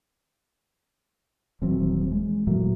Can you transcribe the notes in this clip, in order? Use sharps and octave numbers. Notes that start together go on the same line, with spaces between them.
D#1 E3 F#3 C4
G#3
A#2 E3 F#3 A3